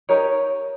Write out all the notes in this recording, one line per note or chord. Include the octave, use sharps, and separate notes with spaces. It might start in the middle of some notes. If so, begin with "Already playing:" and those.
D#4 G4 A#4 C#5